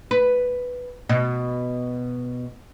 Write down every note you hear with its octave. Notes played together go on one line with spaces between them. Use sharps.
B4
B2